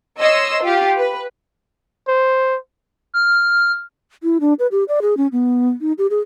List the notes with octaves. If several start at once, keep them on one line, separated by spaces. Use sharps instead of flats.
C#5 D#5 C6 E6
F4 G4
B4
C5
F6
E4
D4
B4
G4
D5
G#4
C#4
B3
D#4
G4
G#4